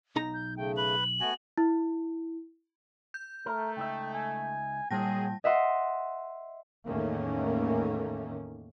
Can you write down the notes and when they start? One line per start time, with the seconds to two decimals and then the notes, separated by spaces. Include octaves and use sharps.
0.16 B1 D#4 A#5
0.34 G6
0.57 C#3 A3 G5
0.77 B4 F#7
1.21 A3 B3 F#4 G#5
1.58 E4
3.14 G6
3.46 A3 A#4
3.77 C#2 D#4 E5 G5
4.14 G#5
4.91 A#2 D#3 F#3 G3 G#4 G5 A5 A#6
5.44 D#5 E5 F#5 C6
6.86 E2 A2 D#3 A3 A#3 C#4